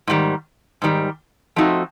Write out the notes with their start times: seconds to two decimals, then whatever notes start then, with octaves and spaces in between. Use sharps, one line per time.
0.07 G#2 D#3 G3
0.82 G#2 D#3 G3
1.56 F3 A3 C4 D#4 F#4